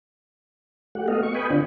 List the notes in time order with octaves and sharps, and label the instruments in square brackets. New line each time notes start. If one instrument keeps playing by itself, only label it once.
[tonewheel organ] A3 F#4 G4 F#5
A3 B3 A4 D#5 F5
C#6
B4 D#5 G5 G#5 B5
D3 C4 D4 F4